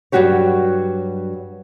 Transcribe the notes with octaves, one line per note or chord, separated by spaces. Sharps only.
G2 F3 F#3 F#4 G4 C#5